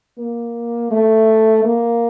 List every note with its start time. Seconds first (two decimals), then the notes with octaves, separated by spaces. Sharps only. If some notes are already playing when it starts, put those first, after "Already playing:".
0.18 A#3
0.91 A3
1.64 A#3